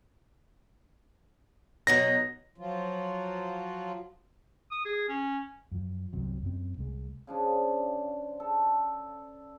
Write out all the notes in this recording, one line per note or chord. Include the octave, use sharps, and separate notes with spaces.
B2 F#3 D#4 A#6
F3 F#3 F4
D#6
G#4
C#4
F#2 F3
G1 C2 C3 F#3
F#2 C4
C2 G#3
C#3 F3 D4
A4